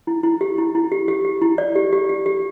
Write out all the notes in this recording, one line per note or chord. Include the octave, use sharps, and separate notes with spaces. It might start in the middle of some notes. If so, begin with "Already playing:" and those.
E4
E4
G4
E4
E4
G4
G4
G4
E4
D5
G4
G4
G4
G4